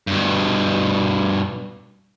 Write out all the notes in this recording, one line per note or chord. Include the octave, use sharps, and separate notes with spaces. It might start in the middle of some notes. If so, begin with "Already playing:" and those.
G2 B2